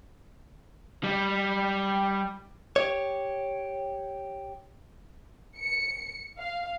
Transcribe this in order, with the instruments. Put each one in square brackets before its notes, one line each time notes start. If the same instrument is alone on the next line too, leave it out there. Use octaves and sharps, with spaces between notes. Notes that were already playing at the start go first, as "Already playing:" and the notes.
[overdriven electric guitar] G3
[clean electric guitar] G4 C#5
[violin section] C#7
F5